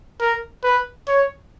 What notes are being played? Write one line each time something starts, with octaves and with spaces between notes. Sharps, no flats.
A#4
B4
C#5